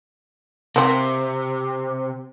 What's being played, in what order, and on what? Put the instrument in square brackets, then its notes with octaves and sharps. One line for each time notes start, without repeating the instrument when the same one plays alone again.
[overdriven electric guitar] C3 [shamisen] A#3 C4